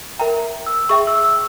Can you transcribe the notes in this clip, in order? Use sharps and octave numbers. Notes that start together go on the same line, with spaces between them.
A#4 E5 G5 A#5
E6
G#4 E5 G5 C#6
E6
E6